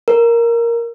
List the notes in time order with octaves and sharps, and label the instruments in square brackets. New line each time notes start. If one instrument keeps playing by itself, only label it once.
[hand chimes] A#4